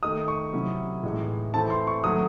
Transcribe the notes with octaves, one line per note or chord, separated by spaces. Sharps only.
D#3 A3 D#4 D#6
C#6
C3 F#3 C#4 E4
A2 E3 G#3 D#4
E3 A3 C4 E4 A5
C6
C#6
D#3 F#3 A3 D#6